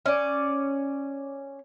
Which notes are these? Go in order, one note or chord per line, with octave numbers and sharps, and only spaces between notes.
C#4 D5